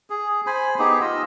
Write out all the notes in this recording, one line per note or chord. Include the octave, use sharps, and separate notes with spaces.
G#4
C5 G#5 B5
B3 D#4 G4 G#4
F4 D#5 E6